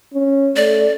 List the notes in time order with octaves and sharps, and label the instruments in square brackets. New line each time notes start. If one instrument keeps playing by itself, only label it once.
[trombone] C#4
[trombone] A3 [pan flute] D5